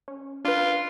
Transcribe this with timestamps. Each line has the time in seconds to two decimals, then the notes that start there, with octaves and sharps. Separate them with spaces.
0.08 C#4
0.45 D4 F4 B4